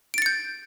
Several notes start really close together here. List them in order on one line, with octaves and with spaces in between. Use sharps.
D7 A6 C#7 G6